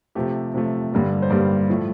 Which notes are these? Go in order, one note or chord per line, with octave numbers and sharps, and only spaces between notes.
C3 F3 A3 G4
C3 F3 A3
G2 D3 G3 A#3
C5
G2 D3 G3 A#3 D5
A2 F3 A3